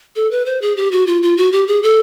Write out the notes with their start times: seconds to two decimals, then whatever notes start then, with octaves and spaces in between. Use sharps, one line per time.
0.16 A4
0.31 B4
0.46 C5
0.62 G#4
0.77 G4
0.92 F#4
1.07 F4
1.23 F4
1.37 F#4
1.52 G4
1.67 G#4
1.83 A4